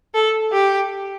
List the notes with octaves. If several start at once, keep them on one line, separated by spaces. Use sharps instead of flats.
A4
G4